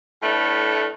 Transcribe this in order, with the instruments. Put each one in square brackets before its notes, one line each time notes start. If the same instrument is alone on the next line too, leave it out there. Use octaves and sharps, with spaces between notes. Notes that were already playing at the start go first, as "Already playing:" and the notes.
[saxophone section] A2 A3 B3 D4